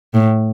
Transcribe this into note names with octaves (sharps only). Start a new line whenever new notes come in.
A2